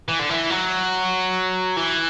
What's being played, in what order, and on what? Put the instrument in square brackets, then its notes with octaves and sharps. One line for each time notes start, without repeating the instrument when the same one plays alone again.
[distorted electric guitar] E3
D3
E3
F#3
E3